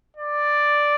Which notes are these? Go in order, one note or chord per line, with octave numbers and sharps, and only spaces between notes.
D5